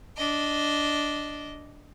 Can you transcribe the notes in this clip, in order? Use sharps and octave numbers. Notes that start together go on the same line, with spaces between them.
D4 D#5